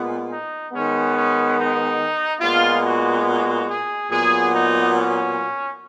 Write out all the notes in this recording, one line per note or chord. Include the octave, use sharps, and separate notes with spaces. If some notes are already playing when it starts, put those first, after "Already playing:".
Already playing: A#2 G#3 B3
D#4
D#3 G#3 B3 C#4
C#4
D#4
A#2 G#3 B3 F4
F#4
F#4
G#4
A#2 F#3 B3 G#4
D#4
C#4